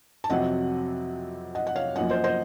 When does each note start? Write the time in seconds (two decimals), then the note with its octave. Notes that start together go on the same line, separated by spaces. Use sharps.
0.24 A5
0.29 F2 C3 F#3 C4 D#5 F#5
1.55 D#5 F#5
1.67 F#5
1.76 C#5 F5
1.96 F#2 F3 A#3 D#5 F#5
2.10 C5 D#5
2.24 C5 D#5